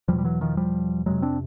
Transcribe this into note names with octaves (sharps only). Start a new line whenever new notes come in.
E2 B2 F3 G3
G3
E3 F#3
D#3 F3
F3 G3
F2 C3 F#3 G#3
C4 D4